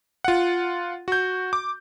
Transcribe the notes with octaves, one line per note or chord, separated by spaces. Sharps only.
F4 F#5
F#4 G6
D6